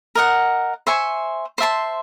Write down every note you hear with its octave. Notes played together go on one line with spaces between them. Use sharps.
A#4 D#5 F#5
C5 E5 G#5 C#6
C5 E5 A5 C6